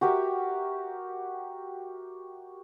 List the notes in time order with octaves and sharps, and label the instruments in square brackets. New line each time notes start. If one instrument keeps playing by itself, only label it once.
[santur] F#4 G4 A#4 E5